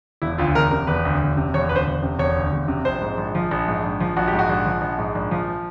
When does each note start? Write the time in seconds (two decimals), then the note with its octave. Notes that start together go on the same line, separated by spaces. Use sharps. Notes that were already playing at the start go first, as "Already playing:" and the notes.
0.22 E1 E4
0.38 D2 F4
0.55 E1 A#4
0.71 C3 A#4
0.87 E1 B4
1.05 D2
1.21 E1
1.37 C3
1.54 E1 C#5
1.69 D2 B4
1.76 C5
1.87 E1
2.03 C3
2.19 E1 C#5
2.36 D2
2.52 E1
2.68 C3
2.85 A#1 C5
3.02 G#2
3.18 A#1
3.35 F3
3.51 A#1
3.68 G#2
3.84 A#1
4.00 F3
4.17 A#1 F#4
4.28 G4
4.33 G#2
4.39 F#4
4.49 A#1
4.66 F3
4.82 A#1
4.98 G#2
5.15 A#1
5.31 F3